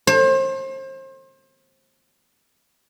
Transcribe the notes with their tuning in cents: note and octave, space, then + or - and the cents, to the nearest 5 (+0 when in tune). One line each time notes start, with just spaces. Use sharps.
C5 +35